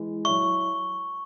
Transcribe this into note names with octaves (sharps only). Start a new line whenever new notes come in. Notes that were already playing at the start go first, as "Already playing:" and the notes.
Already playing: E3 G#3
F#3 E4 C#5 E5 C#6